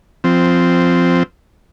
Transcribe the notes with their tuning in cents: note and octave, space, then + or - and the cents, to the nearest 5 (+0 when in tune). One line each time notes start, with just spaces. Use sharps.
F3 +0 C4 -10